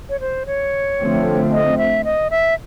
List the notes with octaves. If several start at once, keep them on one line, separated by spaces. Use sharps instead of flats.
C#5
C5
C#5
D3 F3 A3 C4
D#5
E5
D#5
E5